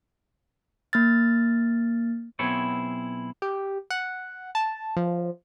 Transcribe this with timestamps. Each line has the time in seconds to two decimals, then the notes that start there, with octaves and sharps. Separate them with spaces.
0.93 A#3 F6 A6
2.39 B1 B3 C4 E4 G#4 C#5
3.42 G4
3.90 F#5
4.55 A5
4.97 F3